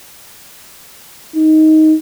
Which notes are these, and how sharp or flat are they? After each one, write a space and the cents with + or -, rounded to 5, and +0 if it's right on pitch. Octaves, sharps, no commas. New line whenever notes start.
D#4 +10